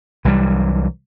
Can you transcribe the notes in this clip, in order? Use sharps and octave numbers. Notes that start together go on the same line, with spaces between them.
C2 E3 F#3 G3